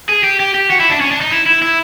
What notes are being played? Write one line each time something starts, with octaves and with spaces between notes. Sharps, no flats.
G#4
G4
G4
G4
F#4
E4
D4
C#4
D4
D#4
E4
E4
E4